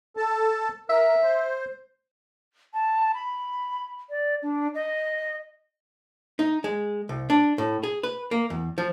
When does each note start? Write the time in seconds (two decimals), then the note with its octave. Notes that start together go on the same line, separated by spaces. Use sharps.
0.17 A4 A5
0.89 A#4 E5
1.23 C5
2.74 A5
3.14 B5
4.10 D5
4.42 D4
4.75 D#5
6.39 D#4
6.64 G#3
7.09 C2
7.30 D4
7.58 A2
7.83 G#4
8.03 B4
8.31 A#3
8.50 E2
8.78 F3